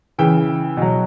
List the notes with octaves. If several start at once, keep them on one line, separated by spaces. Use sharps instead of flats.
C#3 E3 G5
B2 F#3